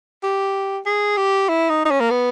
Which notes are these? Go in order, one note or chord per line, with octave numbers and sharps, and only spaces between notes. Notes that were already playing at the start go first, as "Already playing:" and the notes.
G4
G#4
G4
E4
D#4
D#4
C#4
A#3
B3